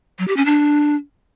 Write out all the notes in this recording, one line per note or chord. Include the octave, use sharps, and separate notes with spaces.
F#3
G4
C#4
D4